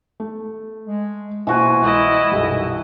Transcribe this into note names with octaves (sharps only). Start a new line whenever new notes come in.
A3
G#3
B2 E3 A#3 F4 F#4 C5 G#5
C2 G#3 E4 D#5
B1 F#2 A#2 G3